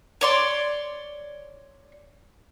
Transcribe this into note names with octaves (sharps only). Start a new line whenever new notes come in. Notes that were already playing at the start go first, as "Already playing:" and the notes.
C#5 D5 C6